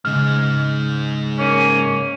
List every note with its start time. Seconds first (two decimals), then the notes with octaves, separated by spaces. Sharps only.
0.05 G#2 C#3 D#4 F6
1.38 A#3 C#4